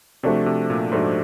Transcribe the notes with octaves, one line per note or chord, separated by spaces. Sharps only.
C3 F3 A3 D4 F#4
C3
A#2
G#2 F3 A3 D4 F#4